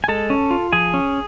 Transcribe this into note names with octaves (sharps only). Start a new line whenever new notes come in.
G#5
G#3 A4 A5
C#4
F4
F3 G#4 G#5
C#4